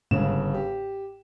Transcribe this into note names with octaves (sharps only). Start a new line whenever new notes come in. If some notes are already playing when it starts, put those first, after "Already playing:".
G1 G#2 C#3 E7
G4